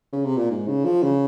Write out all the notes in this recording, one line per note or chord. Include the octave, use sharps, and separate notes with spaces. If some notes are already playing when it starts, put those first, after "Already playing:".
C#3
C3
A#2
G#2
C#3
F3
C#3